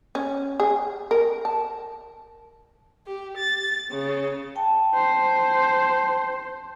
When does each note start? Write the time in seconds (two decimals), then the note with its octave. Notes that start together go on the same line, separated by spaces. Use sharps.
0.15 C#4
0.60 G#4
1.11 A#4
1.45 A5
3.06 G4
3.37 A6
3.91 C#3
4.56 G5 A5
4.94 C5